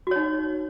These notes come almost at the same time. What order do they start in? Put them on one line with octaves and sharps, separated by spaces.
F#4 C#5 D#4